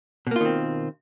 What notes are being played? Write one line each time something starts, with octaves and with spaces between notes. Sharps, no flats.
B2 D#3 A#3 C4 F4